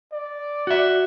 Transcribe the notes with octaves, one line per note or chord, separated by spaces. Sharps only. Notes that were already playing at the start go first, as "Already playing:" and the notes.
D5
F#4 E5